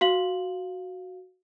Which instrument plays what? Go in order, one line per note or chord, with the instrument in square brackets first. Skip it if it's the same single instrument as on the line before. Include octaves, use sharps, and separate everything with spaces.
[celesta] F#4 F5 F#7